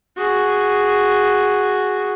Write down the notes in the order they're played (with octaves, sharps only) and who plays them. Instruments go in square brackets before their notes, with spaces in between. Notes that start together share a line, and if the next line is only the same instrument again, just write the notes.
[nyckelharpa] F#4 G#4